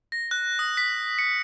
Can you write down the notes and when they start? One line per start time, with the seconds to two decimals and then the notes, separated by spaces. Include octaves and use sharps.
0.12 A#6
0.31 F#6
0.59 D#6
0.77 B6
1.18 C#7